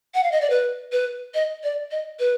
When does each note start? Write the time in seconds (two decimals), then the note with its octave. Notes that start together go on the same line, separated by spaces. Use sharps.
0.14 F#5
0.23 F5
0.32 D#5
0.41 D5
0.50 B4
0.92 B4
1.34 D#5
1.64 D5
1.91 D#5
2.19 B4